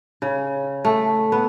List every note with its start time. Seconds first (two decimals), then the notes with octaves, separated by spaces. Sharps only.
0.22 C#3
0.85 A3
1.32 B3